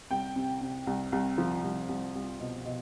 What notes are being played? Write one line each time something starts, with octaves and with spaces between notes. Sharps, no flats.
C2 G5
C3
C3
C2
C2
F3
C2
C2
C2
B2
B2